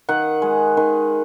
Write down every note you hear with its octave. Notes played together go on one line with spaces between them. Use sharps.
D#3 F#5
G#3
D#3